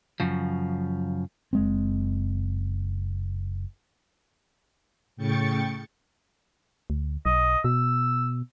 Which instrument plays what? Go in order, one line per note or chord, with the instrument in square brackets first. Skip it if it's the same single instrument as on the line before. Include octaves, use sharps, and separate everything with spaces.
[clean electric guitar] F#2 C#3 F3
[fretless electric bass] F#1 G#3 C4
[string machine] A2 C#3 G5 C#6 A6 C#7
[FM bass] D2
[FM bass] B1 [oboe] D#5
[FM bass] B2 [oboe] E6